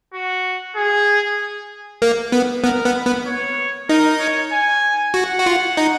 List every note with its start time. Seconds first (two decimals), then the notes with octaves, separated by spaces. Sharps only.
0.14 F#4
0.76 G#4
2.02 A#3
2.32 B3
2.64 B3 A#4
2.85 B3
2.96 B4
3.06 B3
3.27 C#5
3.89 D#4 A#4
4.20 C#5
4.52 G#5
5.14 F#4 F#5
5.39 F#4
5.46 F4
5.77 D#4